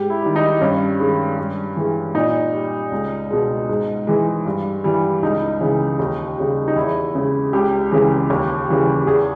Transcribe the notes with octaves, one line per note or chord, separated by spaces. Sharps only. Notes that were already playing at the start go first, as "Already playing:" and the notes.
Already playing: G#2 G4
E4
D#3 G3
D#4
G2 C#4
D#3 G#3
G2
E3 G#3
A#2 D#4
G3
C#2
B2 G#3
G#2
E3 G#3
G2
E3 G3
C#2 D#4
C#3 E3
D#2
C#3 G3
D#4
E2 E4
C#3 G#3
C#2 G4
C#3 E3 G#3
D#2
C#3 E3 G3
E2 G#4